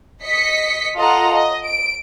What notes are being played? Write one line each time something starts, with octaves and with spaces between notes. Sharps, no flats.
D#5 B6 C#7
F4 A4 D#5 F#5 A#5
D#5
D7